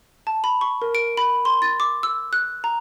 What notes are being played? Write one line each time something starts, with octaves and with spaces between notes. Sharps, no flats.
A5
B5
C#6
A#4
D7
B5
C6
A6
D6
E6
F#6
A#5